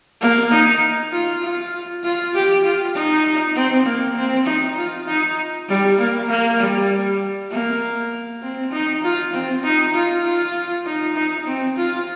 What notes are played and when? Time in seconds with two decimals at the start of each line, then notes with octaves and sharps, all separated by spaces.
0.21 A#3
0.51 D#4
1.12 F4
1.42 F4
2.03 F4
2.34 G4
2.64 F4
2.94 D#4
3.55 C4
3.85 A#3
4.16 C4
4.46 D#4
4.77 F4
5.07 D#4
5.68 G3
5.99 A#3
6.29 A#3
6.59 G3
7.51 A#3
8.42 C4
8.72 D#4
9.03 F4
9.33 C4
9.63 D#4
9.94 F4
10.24 F4
10.85 D#4
11.16 D#4
11.46 C4
11.77 F4